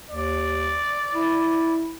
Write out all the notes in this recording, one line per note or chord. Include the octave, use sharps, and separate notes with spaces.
D#2 D5
E4